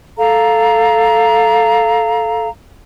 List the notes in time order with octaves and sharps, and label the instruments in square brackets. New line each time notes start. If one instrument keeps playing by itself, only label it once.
[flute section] A4 F5 A#5